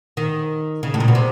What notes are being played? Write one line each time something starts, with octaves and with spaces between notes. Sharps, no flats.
D#3
C#3
A2
A#2
B2
C3